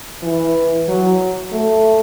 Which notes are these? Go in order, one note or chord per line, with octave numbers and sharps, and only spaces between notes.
E3
F#3
A3